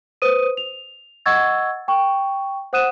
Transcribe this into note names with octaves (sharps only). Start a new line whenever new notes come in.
B4 C5 D#6 D#7
F7
D#5 F#5 C#6 E6 G#6 A6
G5 C#6
C5 F#5 D#6 F#6 D#7 E7